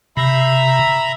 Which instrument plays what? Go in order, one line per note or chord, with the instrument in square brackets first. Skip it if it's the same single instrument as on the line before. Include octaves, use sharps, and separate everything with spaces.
[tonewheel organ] C3 [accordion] E5 A#5 B5